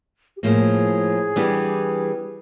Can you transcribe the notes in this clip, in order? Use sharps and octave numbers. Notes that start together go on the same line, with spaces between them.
G4
A2 F3 A#3 G#4
E3 G3 B3 D4 G4